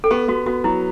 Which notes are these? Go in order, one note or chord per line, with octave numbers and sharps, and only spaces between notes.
A4
B3 G4
B3 F#4
B3 F#4
F#3 E4